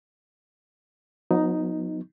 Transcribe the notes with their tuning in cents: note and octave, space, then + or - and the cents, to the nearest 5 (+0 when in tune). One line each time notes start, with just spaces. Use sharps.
F#3 -45 B3 +0 D#4 +0